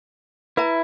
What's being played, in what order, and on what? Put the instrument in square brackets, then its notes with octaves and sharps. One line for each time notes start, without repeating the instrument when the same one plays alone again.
[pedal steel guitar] E4 [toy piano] B4 E5 A#5